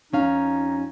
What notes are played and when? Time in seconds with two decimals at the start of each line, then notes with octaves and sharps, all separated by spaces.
0.13 F2 C#4 D#4 F5